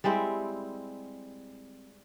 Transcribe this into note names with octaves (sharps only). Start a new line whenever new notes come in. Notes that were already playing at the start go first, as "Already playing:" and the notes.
G3 G#3 C4 E4